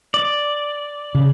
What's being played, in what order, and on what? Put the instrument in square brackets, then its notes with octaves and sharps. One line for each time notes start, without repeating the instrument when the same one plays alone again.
[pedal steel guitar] D5
[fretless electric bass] C#3